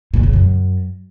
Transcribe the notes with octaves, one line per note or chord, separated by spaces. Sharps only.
A#2
C#3
F#2